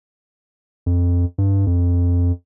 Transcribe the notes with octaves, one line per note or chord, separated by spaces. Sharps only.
F2
G2
F2